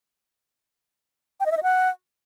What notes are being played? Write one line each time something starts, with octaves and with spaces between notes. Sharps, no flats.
G5
D#5
E5
D#5
F#5